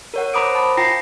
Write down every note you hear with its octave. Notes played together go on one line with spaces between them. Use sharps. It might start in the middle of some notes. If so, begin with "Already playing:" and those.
A#4 C#5 F#5
C5 A#5 B5 D6 D#6 D7
A5
F4 G5 A#5 A#6 C7